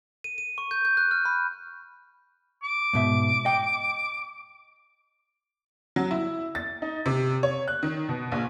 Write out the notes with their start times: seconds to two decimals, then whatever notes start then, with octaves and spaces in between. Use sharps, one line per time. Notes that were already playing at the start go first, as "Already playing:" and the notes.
0.24 D#7
0.38 D#7
0.58 C#6
0.71 G6
0.85 G6
0.97 F#6
1.11 F6
1.25 B5
2.64 D6
2.93 G#2 B2 E5
3.45 D#5 G5
5.96 F#3
6.11 E4
6.55 A6
6.82 D#4
7.06 C3
7.43 C#5
7.68 F#6
7.83 D#3
8.09 B2
8.32 A#1